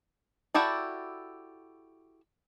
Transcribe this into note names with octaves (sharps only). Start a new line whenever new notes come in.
E4 F#4 G4 A4 D5